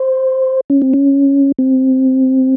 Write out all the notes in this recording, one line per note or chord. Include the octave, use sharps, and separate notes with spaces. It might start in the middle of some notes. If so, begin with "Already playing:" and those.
Already playing: C5
C#4
C4
C#4
C4